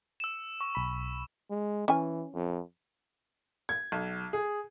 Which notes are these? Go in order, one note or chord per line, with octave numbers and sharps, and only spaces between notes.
E6 E7
C#6
B1 B5
G#3
E3 C#4 G#5
F2
G#6
B1
G#4